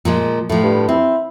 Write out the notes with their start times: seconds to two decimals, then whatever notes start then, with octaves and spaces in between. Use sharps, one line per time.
0.05 A#2 F3 G#3
0.49 A2 F3 A3
0.64 G2
0.88 C4 E4